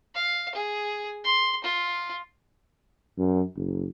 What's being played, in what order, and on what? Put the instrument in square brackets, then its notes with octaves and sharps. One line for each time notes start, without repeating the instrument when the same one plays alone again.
[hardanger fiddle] F5
G#4
C6
F4
[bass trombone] F#2
F#1